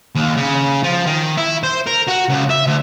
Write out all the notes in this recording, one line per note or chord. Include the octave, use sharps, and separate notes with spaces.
D#2
C#3
F3
D#3
E4
C5
A#4
F#4
C#2
E5
D2